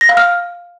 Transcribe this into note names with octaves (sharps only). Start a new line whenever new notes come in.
A#6
F5
F6